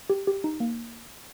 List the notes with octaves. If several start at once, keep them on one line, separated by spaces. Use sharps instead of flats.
G4
G4
D#4
A#3